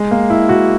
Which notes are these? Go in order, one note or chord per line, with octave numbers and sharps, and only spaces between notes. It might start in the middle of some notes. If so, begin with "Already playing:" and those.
Already playing: G#3
A#3
E4
F#4